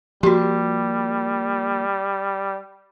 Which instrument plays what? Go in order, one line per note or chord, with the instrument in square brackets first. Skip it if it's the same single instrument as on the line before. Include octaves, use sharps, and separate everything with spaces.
[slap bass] F3 A#3 [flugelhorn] G3 [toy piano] F#4 G4